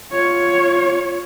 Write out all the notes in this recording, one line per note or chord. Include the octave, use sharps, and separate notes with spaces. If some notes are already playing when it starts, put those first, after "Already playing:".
F4 C#5